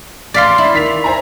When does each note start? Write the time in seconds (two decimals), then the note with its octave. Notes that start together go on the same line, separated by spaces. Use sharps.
0.34 D5 F5 C6 A6 B6 C7
0.58 E4
0.74 D#3 B6 F7
1.04 C5 G#5 A#5